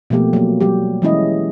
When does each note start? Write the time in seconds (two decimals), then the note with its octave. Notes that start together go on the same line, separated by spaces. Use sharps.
0.10 B2 F3 A3 A#3 G4
0.33 F#3 A#3
0.61 F#3 G3 G4
1.02 E3 G#3 C#4 E4 D#5